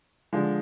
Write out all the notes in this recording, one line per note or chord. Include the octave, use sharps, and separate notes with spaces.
D3 F3 G#3